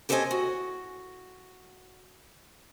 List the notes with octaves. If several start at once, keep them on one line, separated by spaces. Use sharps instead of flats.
G4 A4 C5 C#5 D#5 G#5
F#4